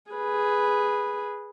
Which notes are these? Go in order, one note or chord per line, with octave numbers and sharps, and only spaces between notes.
G#4 B4